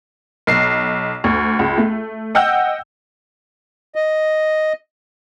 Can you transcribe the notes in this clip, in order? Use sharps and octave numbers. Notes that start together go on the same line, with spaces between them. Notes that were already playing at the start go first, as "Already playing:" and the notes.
B1 C7
D2
C#2
A3
D#5 F#5 G5 E6 G6
D#5